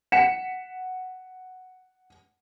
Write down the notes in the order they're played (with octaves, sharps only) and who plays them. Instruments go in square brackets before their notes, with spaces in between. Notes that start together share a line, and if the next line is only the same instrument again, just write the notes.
[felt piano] F#5 B6 C#7 E7